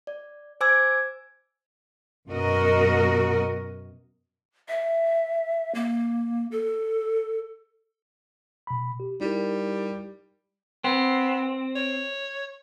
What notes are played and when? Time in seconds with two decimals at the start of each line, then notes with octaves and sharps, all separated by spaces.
0.07 D5
0.61 C5 G#5 D6 E6 G#6
2.29 F#2 B2 F#4 A#4 D#5
4.68 E5
5.75 A#3
6.51 A4
8.67 B2 B5
9.00 G4
9.21 G3 D#4 E4 A#4
10.84 B3 C4
11.75 C#5